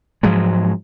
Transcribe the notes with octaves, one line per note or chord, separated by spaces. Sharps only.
G#2 F3 F#3 G#3